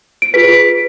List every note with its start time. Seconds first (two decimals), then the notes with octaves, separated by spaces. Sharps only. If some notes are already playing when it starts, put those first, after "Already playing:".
0.22 D7
0.34 F4 G#4 B4 B6